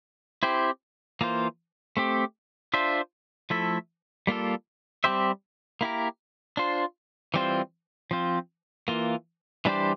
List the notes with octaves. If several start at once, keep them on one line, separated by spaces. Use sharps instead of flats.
C4 E4 G4 C5
E3 A#3 F4 C5
A3 C4 G4
D4 F4 C5 E5
F3 A3 E4 A4 E5
G3 A#3 F4 A4
G3 C4 G4 C5 E5
A#3 E4 G4 A#4
D4 F4 C5
E3 G3 C4 F4 C5
F3 C4 F4
E3 A#3 F4
E3 G3 D4 G4 C5